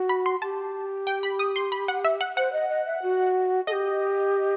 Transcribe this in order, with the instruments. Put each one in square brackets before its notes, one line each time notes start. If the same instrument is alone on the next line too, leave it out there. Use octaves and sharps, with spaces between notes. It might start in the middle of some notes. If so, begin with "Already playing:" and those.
Already playing: [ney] F#4
[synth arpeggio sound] B5
C6
[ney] G4 [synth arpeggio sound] A5
[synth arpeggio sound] G5
B5
D#6
C6
B5
F#5
E5
F#5
[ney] C5 [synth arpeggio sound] F#5
[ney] D#5
D#5
E5
F#4
[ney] G4 A4 [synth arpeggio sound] D#5